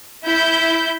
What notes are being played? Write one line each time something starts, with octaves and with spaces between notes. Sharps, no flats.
E4 B5 G6